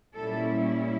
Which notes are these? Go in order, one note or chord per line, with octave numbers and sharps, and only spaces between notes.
A#2 G3 C#4 E4 A4